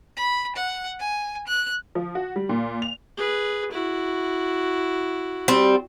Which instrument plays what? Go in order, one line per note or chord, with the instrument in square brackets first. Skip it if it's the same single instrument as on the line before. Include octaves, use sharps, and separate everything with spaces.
[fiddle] B5
F#5
G#5
F#6
[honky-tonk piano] F3
F#4
G3
A#2
F7
[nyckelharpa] G#4 B4
E4 F#4
[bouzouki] G3 C4